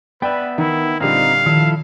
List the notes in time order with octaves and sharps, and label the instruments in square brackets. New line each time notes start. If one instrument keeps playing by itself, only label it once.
[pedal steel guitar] B3 E5 [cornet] B4 [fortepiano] D5 G5
[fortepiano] D#3 [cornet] E4
[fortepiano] A#2 D3 G3 [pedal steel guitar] C4 D#4 [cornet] F5
[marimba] D#3 [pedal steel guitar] F3 E4 A4